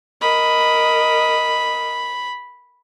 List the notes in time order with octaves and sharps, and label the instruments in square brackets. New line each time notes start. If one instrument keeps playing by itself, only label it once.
[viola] A#4 D#5 [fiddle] B5